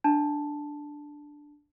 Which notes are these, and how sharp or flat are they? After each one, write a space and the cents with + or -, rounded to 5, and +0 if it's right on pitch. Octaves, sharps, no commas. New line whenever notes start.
D4 +0 A5 +0